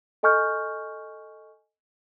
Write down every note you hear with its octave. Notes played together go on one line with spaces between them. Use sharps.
A4 D#5 G#5 C#6 F6 G6